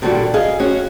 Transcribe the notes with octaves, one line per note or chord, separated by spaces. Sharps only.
A#2 D3 D#3 G3 F#4
G#4 D#5 F5
C#4 F#4